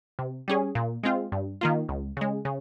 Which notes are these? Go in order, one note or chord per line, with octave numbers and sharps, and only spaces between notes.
C3
G3 C#4 G#4
A#2
G#3 C4 F4
G2
D#3 A#3 F4
C#2
C#3 G#3
C#3